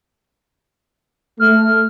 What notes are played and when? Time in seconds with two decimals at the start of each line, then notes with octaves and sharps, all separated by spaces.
1.40 A3 F6